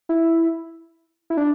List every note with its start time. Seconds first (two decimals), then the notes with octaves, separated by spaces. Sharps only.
0.09 E4
1.30 E4
1.37 D4